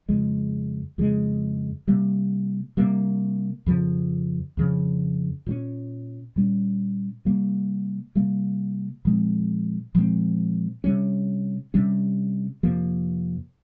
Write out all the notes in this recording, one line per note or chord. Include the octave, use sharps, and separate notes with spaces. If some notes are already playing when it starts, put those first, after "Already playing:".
F2 C#3 G#3
F2 C#3 G#3
C3 G3 A#3
C3 G3 A#3
F2 C#3 F3
F2 C#3 F3
A#2 G3 C#4
A#2 G3 C#4
C3 G3 A#3
C3 G3 A#3
A#2 F3 G#3 C4
A#2 F3 G#3 C4
C3 G3 C#4
C3 G3 C#4
F2 C3 F3 A#3